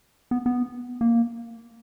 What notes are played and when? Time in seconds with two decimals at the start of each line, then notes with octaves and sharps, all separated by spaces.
0.31 B3
0.46 B3
1.01 A#3